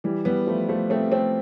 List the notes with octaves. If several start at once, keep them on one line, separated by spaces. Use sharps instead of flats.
E3 G3
G3 B3
F3 A3
F3 A3
A3 C4
A3 C4